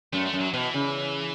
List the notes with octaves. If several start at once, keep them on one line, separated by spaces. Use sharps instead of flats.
F#2 A3
A3
F#2
F#3
B2 E3
C#3